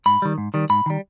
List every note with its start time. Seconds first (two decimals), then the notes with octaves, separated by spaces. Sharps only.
0.06 G#2 B5
0.22 D#3 G3
0.38 G#2
0.54 D#3 G3
0.70 G#2 B5
0.86 D#3 G3